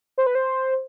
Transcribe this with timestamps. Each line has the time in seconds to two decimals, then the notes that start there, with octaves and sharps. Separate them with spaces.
0.18 C5
0.27 B4
0.35 C5